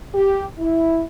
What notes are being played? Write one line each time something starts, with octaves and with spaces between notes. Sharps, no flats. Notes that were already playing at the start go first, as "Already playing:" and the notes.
G4
E4